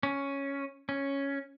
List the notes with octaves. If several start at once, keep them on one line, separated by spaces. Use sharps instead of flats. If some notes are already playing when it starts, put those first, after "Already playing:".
C#4
C#4